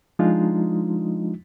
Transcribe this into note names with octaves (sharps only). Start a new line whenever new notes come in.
F3 G#3 D4 D#4 F4